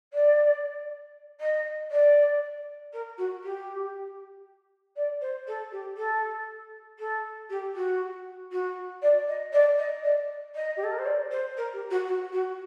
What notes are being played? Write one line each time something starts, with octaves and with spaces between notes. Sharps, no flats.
D5
D#5
D5
A#4
F#4
G4
D5
C5
A4
G4
A4
A4
G4
F#4
F#4
D5
D#5
D5
D#5
D5
D#5
G4
A4
A#4
C5
D5
C5
A#4
G4
F#4
F#4
F#4